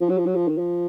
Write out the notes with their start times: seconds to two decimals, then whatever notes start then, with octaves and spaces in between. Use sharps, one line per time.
0.01 F3
0.09 F#3
0.18 F3
0.26 F#3
0.35 F3
0.48 D#3
0.58 F3